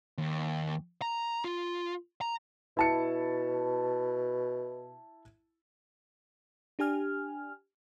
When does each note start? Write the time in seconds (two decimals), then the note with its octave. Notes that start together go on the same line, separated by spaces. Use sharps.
0.18 D#2
1.02 A#5
1.44 F4
2.21 A#5
2.77 B2 E4 A5 C#7
6.79 D4 G4 G#5 F6